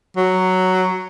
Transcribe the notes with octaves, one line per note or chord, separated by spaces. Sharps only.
F#3